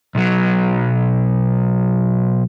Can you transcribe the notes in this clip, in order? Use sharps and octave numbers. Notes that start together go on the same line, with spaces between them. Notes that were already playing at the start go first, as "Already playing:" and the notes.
B1 F#3